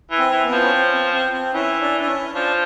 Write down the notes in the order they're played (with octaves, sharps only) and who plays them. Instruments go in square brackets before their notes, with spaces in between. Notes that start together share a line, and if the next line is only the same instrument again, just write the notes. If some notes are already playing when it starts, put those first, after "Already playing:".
[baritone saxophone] E3
[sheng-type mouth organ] C4
[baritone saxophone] E3
[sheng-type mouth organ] B3
[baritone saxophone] F3
[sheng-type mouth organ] C#4
C4
C#4
C4
C4
C4
[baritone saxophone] E3 [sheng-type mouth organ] C#4
[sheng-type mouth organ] D4
D4
C#4
[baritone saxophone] F3 [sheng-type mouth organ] D4